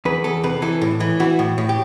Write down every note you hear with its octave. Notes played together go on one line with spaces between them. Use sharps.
E2 B4
E2 A4
C3 B4
E3 A4
A2
E3
E3 F#4
A2
A2
G4